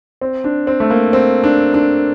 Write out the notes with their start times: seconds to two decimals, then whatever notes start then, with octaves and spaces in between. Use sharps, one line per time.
0.21 C4
0.44 D4
0.67 C4
0.80 A3
0.90 A#3
1.13 C4
1.44 D4
1.74 D4